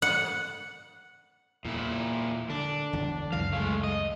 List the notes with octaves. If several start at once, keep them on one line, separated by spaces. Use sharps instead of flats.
F#5
E2 A#2 E4
D3 D4
G1 E2 D3
C#2 F#2 E3 F5
G#3 A3
D#5